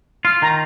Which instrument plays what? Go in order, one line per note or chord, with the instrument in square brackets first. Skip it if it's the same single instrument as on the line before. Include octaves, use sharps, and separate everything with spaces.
[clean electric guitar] F4 [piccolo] F6
[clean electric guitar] D#3 [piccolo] A#5